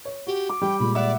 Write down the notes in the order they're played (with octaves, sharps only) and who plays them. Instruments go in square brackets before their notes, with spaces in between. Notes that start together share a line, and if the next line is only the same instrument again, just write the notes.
[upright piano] C#5
[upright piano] F#4 [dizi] G4
[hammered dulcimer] D6
[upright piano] G3 [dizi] G5
[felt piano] A#2 G#3 [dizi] B5
[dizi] D5 [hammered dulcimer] E5 F#5